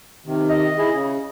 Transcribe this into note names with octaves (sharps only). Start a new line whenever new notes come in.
C3 D#3
D#5
E4 G#4
C#3